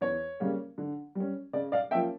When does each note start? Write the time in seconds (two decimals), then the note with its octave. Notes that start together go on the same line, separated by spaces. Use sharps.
0.01 E2 C#5
0.40 C#3 G3 A#3 C#4
0.78 D3
1.15 G3 C#4
1.53 C#3 D5
1.72 D5 F5
1.91 F3 A#3 C#4 E5 G5